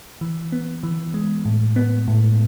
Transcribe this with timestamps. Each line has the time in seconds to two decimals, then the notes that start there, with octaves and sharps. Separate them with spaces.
0.21 E3
0.52 B3
0.83 E3
1.14 G#3
1.45 A2
1.76 B3
2.08 A2